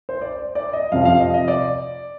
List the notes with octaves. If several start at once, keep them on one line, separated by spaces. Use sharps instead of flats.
C5
D5
D5
D#5
F2 C3 F3 F5
F5
D#5
D#5
D5